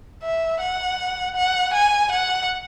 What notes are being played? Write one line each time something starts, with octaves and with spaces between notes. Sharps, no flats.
E5
F#5
F#5
G#5
F#5